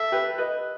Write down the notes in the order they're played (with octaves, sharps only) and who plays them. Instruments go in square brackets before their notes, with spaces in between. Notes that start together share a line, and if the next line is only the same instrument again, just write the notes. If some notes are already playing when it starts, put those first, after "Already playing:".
Already playing: [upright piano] A4 [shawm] E5
[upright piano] G4 B4
B4 D#5